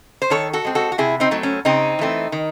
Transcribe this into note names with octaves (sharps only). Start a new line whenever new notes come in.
C5
D#3 A4 C#5
F#4 A4
G#3 C4
F#4 A4
F#4
C3 E4 G#4
C4 D#4
F#3 A3 C4
C#4
C#3 C4 D#4
E3 A3 C4
D#3